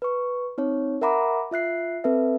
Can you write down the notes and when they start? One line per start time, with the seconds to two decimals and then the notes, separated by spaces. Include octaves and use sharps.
0.02 B4 C#6
0.58 C4 D#4 C#5
1.01 A#4 E5 F#5 A#5 B5 D6
1.51 F4 E5 F#6 C7
2.04 C4 A4 B4 E5